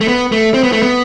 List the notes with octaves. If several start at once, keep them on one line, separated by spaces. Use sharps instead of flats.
A3
B3
A3
C4
B3
A3
B3